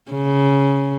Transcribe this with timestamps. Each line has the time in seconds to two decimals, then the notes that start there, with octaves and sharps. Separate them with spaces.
0.11 C#3